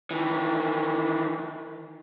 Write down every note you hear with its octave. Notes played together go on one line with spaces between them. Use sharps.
D#3 E3